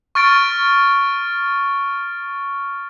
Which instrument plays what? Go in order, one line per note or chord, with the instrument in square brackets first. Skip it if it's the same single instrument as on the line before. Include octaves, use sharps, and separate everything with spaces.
[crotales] C#6 F6 A6 D7